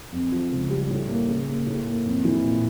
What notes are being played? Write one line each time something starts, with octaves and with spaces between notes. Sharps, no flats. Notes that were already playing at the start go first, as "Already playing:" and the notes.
F2
F3
C#2
G3
A2
A#3
C#3
A#3
A2
A#3
F2
E3
A#2